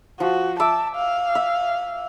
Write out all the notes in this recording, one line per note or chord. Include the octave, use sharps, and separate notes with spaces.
F3 F#4
E5 A5 D6
F5
E5